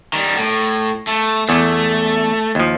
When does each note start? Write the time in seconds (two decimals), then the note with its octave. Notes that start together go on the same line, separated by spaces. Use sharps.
0.13 D#3 G3
0.36 A2
1.07 A3
1.49 E2 A3
2.55 D#2 F3